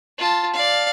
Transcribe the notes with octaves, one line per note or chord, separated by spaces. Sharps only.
F4 A5
D5 F5